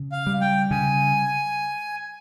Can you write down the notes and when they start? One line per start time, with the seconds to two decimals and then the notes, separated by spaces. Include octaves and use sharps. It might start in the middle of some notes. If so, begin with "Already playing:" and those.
Already playing: C#3
0.12 F5
0.27 G3
0.41 G5
0.71 C#3 G#5